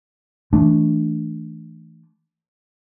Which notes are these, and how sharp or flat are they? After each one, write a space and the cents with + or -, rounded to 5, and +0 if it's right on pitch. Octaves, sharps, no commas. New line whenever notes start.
E3 -20 A3 +0 D4 +0